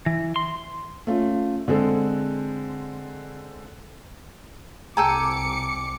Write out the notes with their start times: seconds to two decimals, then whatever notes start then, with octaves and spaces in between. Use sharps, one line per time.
0.06 E3
0.36 C6
1.07 A3 C#4 F4
1.68 D3 G#3 C4 G#4 A4
4.97 C2 A4 G5 G#5 A#5 D6 E6 C#7